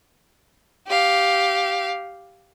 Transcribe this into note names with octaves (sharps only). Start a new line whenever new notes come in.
G4 F5